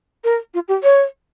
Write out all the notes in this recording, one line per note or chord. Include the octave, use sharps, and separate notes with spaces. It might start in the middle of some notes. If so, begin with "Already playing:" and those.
A#4
F4
G4
C#5